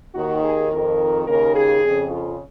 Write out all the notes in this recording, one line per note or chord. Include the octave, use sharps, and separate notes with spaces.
D#2 D#3 F#4
G#4
F2 D#3 A#4
D#2 C#3 A#4
G#4
F2 C#3
F4